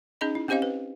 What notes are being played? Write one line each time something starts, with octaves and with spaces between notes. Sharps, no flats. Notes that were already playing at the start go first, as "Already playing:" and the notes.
C#4 D#4 G#4 D#5 B5
E4
C4 C#4 G4 C5 D#5 F5
B4